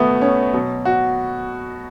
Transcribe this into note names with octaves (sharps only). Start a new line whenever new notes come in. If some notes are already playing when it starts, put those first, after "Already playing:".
Already playing: B2 A3 B3
C#4
B2 F#3
F#4